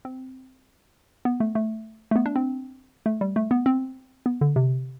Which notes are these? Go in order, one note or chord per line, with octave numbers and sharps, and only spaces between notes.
C4
B3
A3
A3
A3
B3
D4
C4
A3
G3
A3
B3
C4
B3
D3
C3